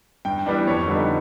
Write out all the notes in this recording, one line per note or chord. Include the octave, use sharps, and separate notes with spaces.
G2 G5
E3 G3 B3 D4
F2 C#5
D3 G3 B3 D#4